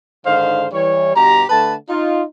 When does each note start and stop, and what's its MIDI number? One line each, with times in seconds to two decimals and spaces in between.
0.25 0.66 44
0.25 0.66 50
0.25 0.66 51
0.25 0.66 72
0.25 0.66 77
0.72 1.11 52
0.72 1.11 55
0.72 1.11 73
1.15 1.43 43
1.15 1.43 47
1.15 1.43 67
1.15 1.43 82
1.50 1.74 50
1.50 1.74 57
1.50 1.74 71
1.50 1.74 81
1.89 2.23 63
1.89 2.23 65